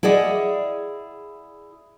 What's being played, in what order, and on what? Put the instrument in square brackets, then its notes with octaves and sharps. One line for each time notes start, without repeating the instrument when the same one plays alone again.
[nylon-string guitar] E4 G#4 D5 D#5 F#5